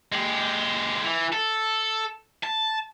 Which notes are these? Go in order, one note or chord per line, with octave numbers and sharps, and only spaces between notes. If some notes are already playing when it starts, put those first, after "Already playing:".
G#3 G4
E3
A4
A5